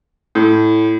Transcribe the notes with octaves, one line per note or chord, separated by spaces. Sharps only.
A2